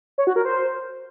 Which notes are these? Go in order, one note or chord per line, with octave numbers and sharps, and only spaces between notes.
C#5
F#4
A#4
C5